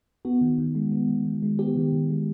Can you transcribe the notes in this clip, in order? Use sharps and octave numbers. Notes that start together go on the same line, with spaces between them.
B3 F#4
D#3
D#3
G#3
B3
D#3
D#3
G#3
B3 G4
D#3
D#3
G#3